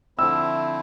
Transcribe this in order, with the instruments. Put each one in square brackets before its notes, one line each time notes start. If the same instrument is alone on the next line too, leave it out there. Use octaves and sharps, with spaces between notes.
[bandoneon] D3 F3 A3 C4 E4 [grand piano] E6